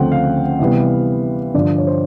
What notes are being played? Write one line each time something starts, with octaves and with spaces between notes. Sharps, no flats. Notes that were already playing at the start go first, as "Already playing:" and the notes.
Already playing: D2 C#3 F3 A3 C4 F#5 G5
F5
C3 E3 G3 B3
G2 D3 F3 D5
C#5
C5